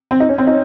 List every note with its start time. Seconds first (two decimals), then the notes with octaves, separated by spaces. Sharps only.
0.11 C4
0.20 D#4
0.29 C#4
0.38 C4
0.47 D#4